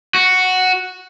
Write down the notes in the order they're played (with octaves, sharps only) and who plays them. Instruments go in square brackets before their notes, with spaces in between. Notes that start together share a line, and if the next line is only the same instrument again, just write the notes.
[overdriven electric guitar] F#4